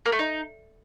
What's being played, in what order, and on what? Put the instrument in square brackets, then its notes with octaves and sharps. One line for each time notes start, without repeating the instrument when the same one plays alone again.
[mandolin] A#3
A3
D#4